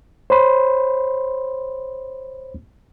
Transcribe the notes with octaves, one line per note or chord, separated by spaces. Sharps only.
C5 C#5 B5 C6